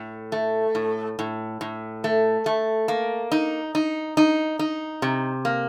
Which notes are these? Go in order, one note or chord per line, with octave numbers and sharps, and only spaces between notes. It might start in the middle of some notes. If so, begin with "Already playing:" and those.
Already playing: A2
A3
A2
A2
A2
A3
A3
A#3
D#4
D#4
D#4
D#4
C3
A#3